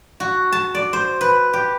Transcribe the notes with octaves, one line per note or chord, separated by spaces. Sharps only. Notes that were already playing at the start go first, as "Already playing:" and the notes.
F#4
A5
D5
C5
B4
G4